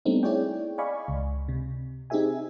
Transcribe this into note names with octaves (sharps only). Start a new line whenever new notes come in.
G3 A3 B3 C4 D4 D#4
E4 G#4 C#5 D5 G5
D5 D#5 F5 G#5 B5 C#6
C#2
C3
C4 D#4 G4 G#4 E5 G#5